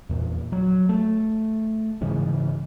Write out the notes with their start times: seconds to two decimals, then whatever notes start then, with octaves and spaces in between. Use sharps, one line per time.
0.09 E2 A#2
0.52 F#3
0.89 A3
2.01 G#2 C#3 E3 G#3